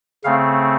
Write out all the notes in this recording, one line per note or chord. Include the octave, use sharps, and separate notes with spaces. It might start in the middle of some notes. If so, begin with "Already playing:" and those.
C#3 A3 C4 F5